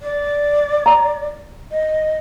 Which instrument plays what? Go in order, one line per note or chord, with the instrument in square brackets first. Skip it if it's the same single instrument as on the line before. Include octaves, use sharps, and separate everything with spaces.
[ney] D5
[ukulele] A#5
[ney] D#5